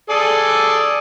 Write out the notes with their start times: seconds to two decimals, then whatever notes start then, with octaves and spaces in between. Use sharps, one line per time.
0.10 G#4 A4 D5